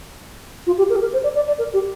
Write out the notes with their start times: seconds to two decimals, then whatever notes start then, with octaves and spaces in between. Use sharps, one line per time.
0.67 F4
0.78 G4
0.90 A#4
0.96 G4
1.01 A#4
1.13 C5
1.24 D5
1.36 D5
1.47 D5
1.59 A#4
1.73 G4